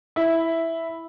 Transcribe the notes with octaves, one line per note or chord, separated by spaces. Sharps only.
E4